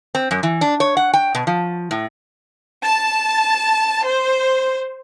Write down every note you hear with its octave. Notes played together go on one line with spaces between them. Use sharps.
C4
F#2
E3
D4
C#5
F#5
G5
B2
F3
A2
A5
C5